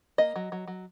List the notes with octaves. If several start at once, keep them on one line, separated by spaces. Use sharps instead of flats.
A#3 D#5
F#3
F#3
F#3